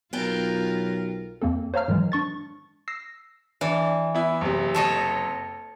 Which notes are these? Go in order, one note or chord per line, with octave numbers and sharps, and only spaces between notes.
B1 B3 F4 A#4 G5
F2 A#3 C4 A4
C5 C#5 F5 A#5 F6
G#2 D#3 E3 F#3 G#3
D4 C#6 A6
E6 A#6 C7
E3 D4
B3 E4
F#1 C3
A4 C#5 D#5